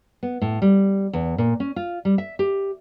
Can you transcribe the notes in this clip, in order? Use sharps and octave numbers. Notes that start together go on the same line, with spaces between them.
B3
A2
G3
E2
A#2
C#4
F4
G3
E5
G4